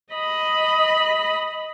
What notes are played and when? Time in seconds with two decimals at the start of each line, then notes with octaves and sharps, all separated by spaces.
0.14 D#5 B5